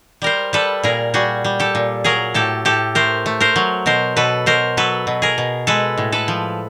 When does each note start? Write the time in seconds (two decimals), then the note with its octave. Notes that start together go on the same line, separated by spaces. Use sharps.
0.22 G3 A#4 C5
0.53 G3 A4 B4
0.83 A#2 G#4 A#4
1.14 G3 F#4 G#4
1.44 G3
1.60 G4 A4
1.75 A#2
2.04 F#3 G#4 A#4
2.34 A2 G4 A4
2.65 A2 G4 A4
2.95 A3 A#4 C5
3.26 A3
3.40 A#4 C5
3.56 F#3
3.86 B2 A#4 C5
4.16 B2 A4 B4
4.46 B2 A#4 C5
4.77 F#3 A4 B4
5.07 B2
5.22 G#4 A#4
5.38 B2
5.67 G#3 A4 B4
5.98 A2
6.12 A4 B4
6.28 F3